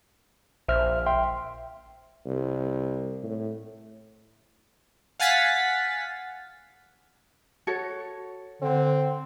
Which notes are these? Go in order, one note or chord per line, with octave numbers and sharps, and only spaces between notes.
A#1 C5 E5 F6
E5 G5 C6
C2
A2
F5 F#5 G#5 A6 B6
F#4 A4 C#5
D3 C4